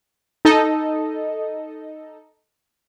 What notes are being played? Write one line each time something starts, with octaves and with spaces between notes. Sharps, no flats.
D#4 A4 D#5